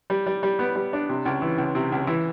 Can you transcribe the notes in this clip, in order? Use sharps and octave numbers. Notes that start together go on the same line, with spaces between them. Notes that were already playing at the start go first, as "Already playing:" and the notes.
G3
G3
G3
B3
G3
D4
C3
C#2
E3
C#2
C3
C#2
E3